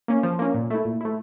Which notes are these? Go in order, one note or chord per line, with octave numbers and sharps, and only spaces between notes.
A#3 C#4
F3
A#3 C#4
A#2
A3 E4
A#2
A3 E4